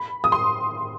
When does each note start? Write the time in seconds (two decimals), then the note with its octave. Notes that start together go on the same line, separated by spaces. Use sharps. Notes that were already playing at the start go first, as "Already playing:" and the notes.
Already playing: B5
0.24 D#6
0.32 C6